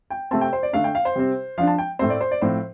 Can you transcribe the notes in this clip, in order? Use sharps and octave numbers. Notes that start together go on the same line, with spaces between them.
G5
C3 A3 C4 A5
G5
C5
D5
D3 A3 D4 F5
G5
F5
C5
C3 G3 C4
F3 D4 F5
A5
G5
A2 A3 C4 C5
D5
C5
D5
A2 F3 C4 C5